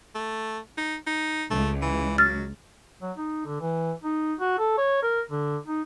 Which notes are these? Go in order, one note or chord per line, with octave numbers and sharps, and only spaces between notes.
A3
D#4
D#4
C#2 A3
E3
F#3 F6 A6
F#3
D#4
D3
E3
D#4
F#4
A4
C#5
A#4
D3
D#4